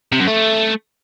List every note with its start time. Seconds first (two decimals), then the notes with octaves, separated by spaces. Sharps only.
0.12 C3
0.20 F#2
0.27 A3